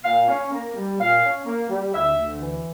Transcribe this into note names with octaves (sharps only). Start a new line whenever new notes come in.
A#2 F5
C#4
A#3
G3
A#2 F5
C#4
A#3
G3
D2 E5
D2
E3